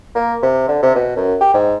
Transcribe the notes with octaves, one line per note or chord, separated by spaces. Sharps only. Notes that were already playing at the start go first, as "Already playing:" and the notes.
A#3
C3
D3
C3
B2
F#2
G4
G#2